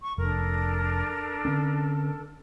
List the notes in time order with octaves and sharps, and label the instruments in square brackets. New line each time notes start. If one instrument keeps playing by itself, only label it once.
[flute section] C#6
[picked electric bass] F1 [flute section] D4 A4 A#4
[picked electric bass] D3 C4 C#4